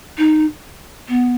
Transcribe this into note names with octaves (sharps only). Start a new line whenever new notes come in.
D#4
B3